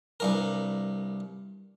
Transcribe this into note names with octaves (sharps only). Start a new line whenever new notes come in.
C2 G2 A#4